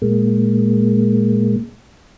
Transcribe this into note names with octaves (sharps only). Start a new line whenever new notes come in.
A#2 G#3 A#3